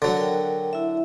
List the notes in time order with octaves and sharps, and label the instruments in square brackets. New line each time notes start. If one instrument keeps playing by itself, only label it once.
[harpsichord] D3 F#3
[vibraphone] A#4 G5
E4 E5